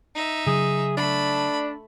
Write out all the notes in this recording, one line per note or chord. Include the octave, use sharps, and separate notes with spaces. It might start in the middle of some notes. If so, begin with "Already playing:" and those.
D#4 E5
C#3 F#3 G#4
A3 D4 B5